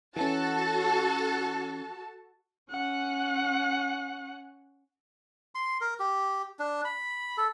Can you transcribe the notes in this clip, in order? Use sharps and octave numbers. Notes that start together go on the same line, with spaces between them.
E3 C#4 F#4 A4 A5
C#4 F#5
C6
A#4
G4
D4
B5
A4